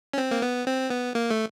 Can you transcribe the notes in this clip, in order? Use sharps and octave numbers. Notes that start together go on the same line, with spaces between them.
C#4
C4
A#3
B3
C4
B3
A#3
A3